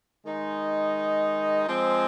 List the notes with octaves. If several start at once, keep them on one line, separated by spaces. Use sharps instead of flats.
D#3 G#3 D#4
F3 G#3 C4